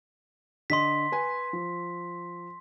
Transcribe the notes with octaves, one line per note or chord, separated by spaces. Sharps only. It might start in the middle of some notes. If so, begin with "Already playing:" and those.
D3 D#5 C6 B6
B4 G#5
F3